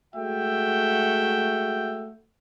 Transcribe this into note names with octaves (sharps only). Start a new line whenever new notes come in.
G#3 A3 F#4 E5 F#5 G5